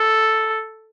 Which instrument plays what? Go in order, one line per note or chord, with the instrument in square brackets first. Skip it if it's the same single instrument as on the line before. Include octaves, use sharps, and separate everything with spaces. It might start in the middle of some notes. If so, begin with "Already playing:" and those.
Already playing: [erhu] A4